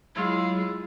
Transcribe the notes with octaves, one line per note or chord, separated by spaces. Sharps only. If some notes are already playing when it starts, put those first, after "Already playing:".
F#3 G#3 E4 F4 G#4